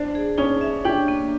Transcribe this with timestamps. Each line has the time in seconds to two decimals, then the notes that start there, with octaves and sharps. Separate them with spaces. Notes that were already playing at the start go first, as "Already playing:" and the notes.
Already playing: D4 C5 D5
0.15 G#4
0.38 C#4 D#4 C#5
0.61 E5
0.85 D4 G4
1.08 A#3